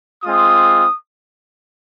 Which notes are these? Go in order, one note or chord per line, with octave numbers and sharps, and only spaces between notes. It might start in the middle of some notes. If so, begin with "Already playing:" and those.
G#3 C4 F4 D#6